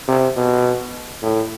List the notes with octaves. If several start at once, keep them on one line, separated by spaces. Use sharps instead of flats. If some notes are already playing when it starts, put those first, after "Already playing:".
C3
B2
A2